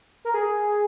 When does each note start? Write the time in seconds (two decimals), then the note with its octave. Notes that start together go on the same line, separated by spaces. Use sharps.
0.25 A#4
0.34 G#4